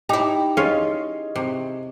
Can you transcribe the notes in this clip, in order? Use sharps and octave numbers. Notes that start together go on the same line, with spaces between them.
D#4 E4 G4
C#4 F4 G#4 C#5 D#5
C3